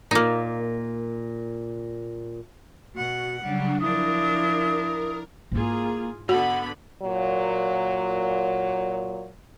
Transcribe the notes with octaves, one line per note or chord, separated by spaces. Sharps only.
A#2 A#3 D#4
B2 F#4 F#5
C#3 F#3 G3 D4 F#5
F3 D4 E4 A#4 D#6
G#2 A#3 E4 F4 G#4
D3 B3 F#4 F#5 B5
A#2 F#3